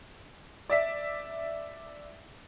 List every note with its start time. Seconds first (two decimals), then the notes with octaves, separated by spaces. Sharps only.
0.70 D5 E5 B6